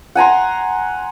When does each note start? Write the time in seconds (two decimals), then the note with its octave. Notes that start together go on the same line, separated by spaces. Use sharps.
0.15 F#5 G#5 A#5 C6